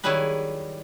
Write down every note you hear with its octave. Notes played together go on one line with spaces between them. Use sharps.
D#3 F#3 G3 E4 G#4 B4